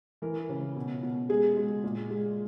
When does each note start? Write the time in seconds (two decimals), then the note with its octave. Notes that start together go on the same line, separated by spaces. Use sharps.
0.22 E3 A#4
0.49 C#3
0.76 B2
1.03 B2
1.29 G#3 G#4
1.57 G#3
1.84 A#2
2.10 G#3